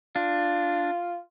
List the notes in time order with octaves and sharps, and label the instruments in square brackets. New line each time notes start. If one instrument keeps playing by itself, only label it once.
[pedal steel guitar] D4 [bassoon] F4